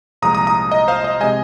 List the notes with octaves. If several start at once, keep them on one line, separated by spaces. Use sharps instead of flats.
C2 A#2 F3 G#3 A#5 D#6
A#5 D#6
A#5 D#6
D#5
C5 F5
D#5
C3 G#3 D#5 G#5